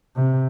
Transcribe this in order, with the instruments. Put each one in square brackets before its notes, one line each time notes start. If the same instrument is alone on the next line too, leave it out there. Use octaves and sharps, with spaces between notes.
[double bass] C3